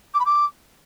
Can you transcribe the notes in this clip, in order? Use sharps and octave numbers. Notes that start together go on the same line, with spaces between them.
D6
B5
D6